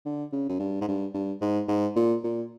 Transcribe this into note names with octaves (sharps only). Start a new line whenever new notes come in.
D3
C#3
F#2
G2
G#2
G2
G2
G#2
G#2
A#2
A#2